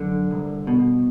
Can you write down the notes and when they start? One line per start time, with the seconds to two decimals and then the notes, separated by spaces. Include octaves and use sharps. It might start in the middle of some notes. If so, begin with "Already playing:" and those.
Already playing: F#2 D3
0.31 C2
0.67 B2